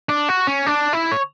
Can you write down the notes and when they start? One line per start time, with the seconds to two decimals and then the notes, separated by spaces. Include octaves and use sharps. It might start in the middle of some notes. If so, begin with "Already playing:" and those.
0.09 D4
0.29 F#4
0.47 C#4
0.66 D4
0.93 E4
1.12 C#5